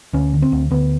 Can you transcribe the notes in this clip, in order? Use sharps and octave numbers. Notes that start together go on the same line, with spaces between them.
D2 C#4
D3
C4
D2
D2 B3